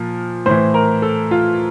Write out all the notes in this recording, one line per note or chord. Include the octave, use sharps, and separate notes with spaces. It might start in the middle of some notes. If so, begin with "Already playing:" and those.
Already playing: A#2 F3
A2 E3 C5
A#4
A4
F4